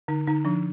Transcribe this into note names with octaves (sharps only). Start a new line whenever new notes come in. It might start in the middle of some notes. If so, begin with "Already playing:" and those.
D3 D#4
D3 D#4
F3 D4